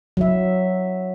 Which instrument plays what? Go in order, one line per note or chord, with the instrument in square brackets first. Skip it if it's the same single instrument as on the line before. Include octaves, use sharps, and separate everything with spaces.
[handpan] F#3 E5